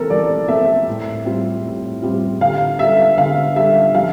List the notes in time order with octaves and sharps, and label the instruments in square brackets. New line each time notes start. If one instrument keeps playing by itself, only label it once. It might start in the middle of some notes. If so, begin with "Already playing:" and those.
Already playing: [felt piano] E3 A3 C4 [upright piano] A4 A#4
[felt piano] E3 [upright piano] D5
[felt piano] A3 C4 [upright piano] E5
[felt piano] A2
G3 C4 F4
A2
G3 C4 F4
[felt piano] D3 [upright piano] F5
[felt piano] G3 D4 A4 [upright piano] E5
[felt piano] D3 [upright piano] F5
[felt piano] G3 D4 A4 [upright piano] E5
[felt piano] F3 [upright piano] F5